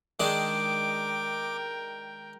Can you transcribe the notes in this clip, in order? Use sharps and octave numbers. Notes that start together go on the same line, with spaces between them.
D#3 G#3 D4 A#4 G5 D6